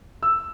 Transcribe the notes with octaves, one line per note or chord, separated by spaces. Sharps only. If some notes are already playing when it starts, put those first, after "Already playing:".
E6